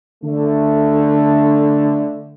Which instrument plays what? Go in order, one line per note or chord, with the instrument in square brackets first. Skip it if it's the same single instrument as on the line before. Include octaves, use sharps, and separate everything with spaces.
[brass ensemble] D3 A3